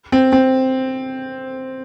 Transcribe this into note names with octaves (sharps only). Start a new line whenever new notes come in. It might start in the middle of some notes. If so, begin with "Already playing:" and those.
C4
C4